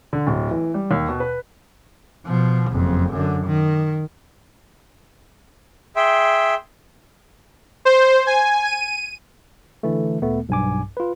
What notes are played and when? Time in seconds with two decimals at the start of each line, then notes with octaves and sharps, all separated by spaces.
0.13 D3
0.27 D1
0.51 E3
0.74 G3
0.91 D#2
1.09 B2
1.20 B4
2.26 B2 F3
2.71 F#1 F2
3.12 F#2 D3
3.46 D#3
5.96 G#4 E5 G5 C6
7.85 C5
8.27 G#5
8.65 D#7
9.83 D3 E3 A3
10.22 D2 A#2 A3 B3
10.49 B1 G2 G#5 D6
10.97 F4 B4